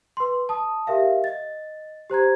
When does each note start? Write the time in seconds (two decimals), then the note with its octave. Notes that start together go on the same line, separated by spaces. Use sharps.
0.17 B4 C6
0.49 A5 D#6
0.87 G4 A#4 E5 F5
1.24 D#5 A6
2.10 G4 C5 A#5 G#6